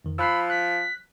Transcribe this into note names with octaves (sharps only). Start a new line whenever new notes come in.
F2 D#3
F3 B5 E6 F#6 C7
F#6 B6